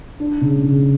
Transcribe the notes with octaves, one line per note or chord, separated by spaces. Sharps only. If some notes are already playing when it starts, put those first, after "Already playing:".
D4
C#3
C#3